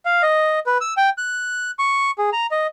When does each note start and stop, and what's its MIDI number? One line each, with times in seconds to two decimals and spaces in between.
0.06 0.22 77
0.23 0.59 75
0.66 0.78 71
0.81 0.94 88
0.97 1.10 79
1.18 1.71 90
1.79 2.11 85
2.18 2.30 68
2.33 2.46 82
2.51 2.67 75